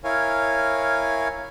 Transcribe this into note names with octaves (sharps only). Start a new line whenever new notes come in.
E4 A#4 C#5 F5 G#5